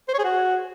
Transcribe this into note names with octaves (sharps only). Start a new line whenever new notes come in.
C5
C#5
G#4
F#4